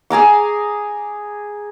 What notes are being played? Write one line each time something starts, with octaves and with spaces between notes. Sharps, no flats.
G#4 G#5 A#5 D6